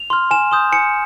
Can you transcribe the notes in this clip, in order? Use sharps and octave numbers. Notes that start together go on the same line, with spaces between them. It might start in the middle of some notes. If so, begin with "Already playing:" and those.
Already playing: F7
C6 F6
G#5 E7
C6 D#6 G6
G#5 C#7